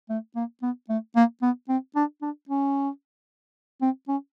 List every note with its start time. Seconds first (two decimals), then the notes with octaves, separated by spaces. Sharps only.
0.10 A3
0.36 A#3
0.62 B3
0.89 A3
1.16 A#3
1.42 B3
1.69 C4
1.96 D4
2.22 D4
2.49 C#4
3.82 C4
4.08 C#4